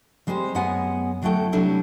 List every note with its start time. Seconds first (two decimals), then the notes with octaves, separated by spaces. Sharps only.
0.27 G3 G#3 C4 G4 C5
0.55 F#2 G#3 B3 C#5 F#5 G#5
1.22 D2 F#3 A3 E4 A4 G5
1.52 C3 F#3 G3 D4 E4 A4